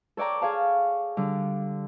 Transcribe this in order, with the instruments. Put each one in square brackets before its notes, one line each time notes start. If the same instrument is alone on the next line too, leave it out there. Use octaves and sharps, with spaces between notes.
[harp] A4 C#5 D5 G5 A#5
G#4 C#5 F5 A5
D3 G3